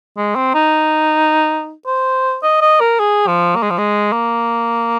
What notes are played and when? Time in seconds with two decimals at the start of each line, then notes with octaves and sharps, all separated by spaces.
0.17 G#3
0.36 C4
0.54 D#4
1.86 C5
2.43 D#5
2.61 D#5
2.80 A#4
2.99 G#4
3.27 F3
3.55 A#3
3.63 G#3
3.70 F3
3.78 G#3
4.12 A#3